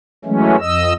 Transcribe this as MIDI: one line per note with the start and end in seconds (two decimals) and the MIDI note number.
0.25 0.56 52
0.25 0.56 54
0.25 0.56 56
0.25 0.56 57
0.25 0.56 61
0.60 0.93 41
0.60 0.93 75
0.60 0.93 88